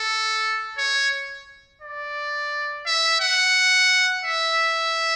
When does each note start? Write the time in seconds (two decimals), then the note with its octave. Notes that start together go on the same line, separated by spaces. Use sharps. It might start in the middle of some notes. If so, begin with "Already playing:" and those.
Already playing: A4
0.78 C#5
1.82 D5
2.86 E5
3.21 F#5
4.25 E5